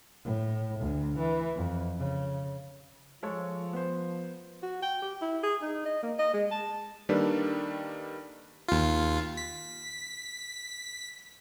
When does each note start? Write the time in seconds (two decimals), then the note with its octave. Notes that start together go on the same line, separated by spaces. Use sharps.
0.24 A2
0.80 D2
1.19 E3
1.56 F2
1.99 C#3
3.23 F3 G#3 A4 C#5
3.73 B3 C5
4.63 F#4
4.82 G5
5.02 G4
5.21 E4
5.43 G#4
5.62 D#4
5.85 D#5
6.02 A#3
6.19 D#5
6.33 G#3
6.51 A5
7.09 D#3 G3 A#3 D4 A4 B4
8.68 D#2 F4
9.37 B6